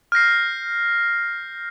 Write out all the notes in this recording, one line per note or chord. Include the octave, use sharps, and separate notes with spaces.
F6 G6 A#6 C7